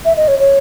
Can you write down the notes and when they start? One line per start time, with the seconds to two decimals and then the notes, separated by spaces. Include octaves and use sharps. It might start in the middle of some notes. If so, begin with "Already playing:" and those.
0.05 E5
0.17 D#5
0.28 C#5
0.39 C#5